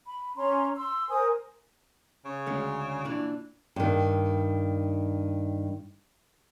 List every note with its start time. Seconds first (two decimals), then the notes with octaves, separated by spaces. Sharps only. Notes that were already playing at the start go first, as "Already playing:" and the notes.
0.05 B5
0.36 C#4 A#5 C6
0.76 C6 E6
1.09 A#4 C5 G#5 D#6
2.25 C#3 C#5
2.46 D2 G#3 C#4
3.05 A#2 E3 D4
3.76 G2 D#3